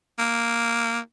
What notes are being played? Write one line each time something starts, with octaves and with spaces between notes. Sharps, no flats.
A#3